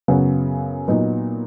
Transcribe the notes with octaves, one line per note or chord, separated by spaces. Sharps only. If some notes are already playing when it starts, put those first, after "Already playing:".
F#2 C#3 F#3 B3
A#2 F#3 B3 D#4